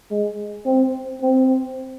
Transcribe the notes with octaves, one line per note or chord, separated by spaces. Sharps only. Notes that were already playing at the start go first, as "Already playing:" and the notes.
G#3
C4
C4